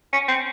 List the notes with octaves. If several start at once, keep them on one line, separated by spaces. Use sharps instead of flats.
C#4
C4